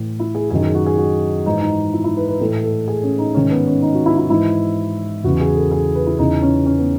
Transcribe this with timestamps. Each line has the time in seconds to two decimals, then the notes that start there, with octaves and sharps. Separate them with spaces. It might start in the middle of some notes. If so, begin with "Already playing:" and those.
Already playing: A2 E3
0.20 E4
0.35 G#4
0.50 F#2 D#3 G#4
0.63 G#4
0.75 F#4
0.86 G#4
0.98 F#4
1.46 G#2 E3 D#4
1.61 D#4
1.93 E4
2.04 E4
2.17 B4
2.28 B4
2.40 A2 E3 A4
2.64 A4
2.88 G#4
3.03 C#4
3.19 D#4
3.34 G#2 D#3 C#4
3.51 B3
3.67 C#4
3.82 D#4
3.95 F#4
4.06 E4
4.18 E4
4.30 G#2 E3 E4
5.24 E2 C#3 E3 F#4
5.40 G#4
5.56 A4
5.71 G#4
5.95 B4
6.07 E4
6.19 E2 C#3 E3 D#4
6.42 C#4
6.66 C#4
6.79 B3